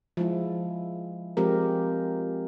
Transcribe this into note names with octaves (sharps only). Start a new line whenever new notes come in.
F3 G#3 E4
F3 G#3 C4 G4 A#4